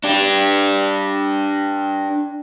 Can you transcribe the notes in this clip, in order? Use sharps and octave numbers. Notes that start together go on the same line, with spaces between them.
D4 G4